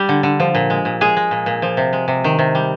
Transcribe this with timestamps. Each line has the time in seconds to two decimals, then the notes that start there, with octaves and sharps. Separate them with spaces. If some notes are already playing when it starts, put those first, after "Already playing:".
Already playing: G3 G4
0.09 D3
0.23 D3
0.40 F3
0.55 A#2
0.70 G#3
0.85 A#2
1.01 G#3 G#4
1.17 G#3
1.31 A#2
1.46 A#2
1.62 F3
1.77 C3
1.93 G#3
2.08 C3
2.24 D#3
2.39 C3
2.55 G3